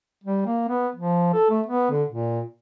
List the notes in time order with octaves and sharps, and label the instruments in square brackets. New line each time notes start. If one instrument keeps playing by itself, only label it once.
[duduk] G3
A#3
B3
F3
A4
A3
B3
D3
A#2